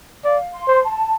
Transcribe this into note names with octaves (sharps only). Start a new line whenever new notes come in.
D5 F5
C6
C5
A5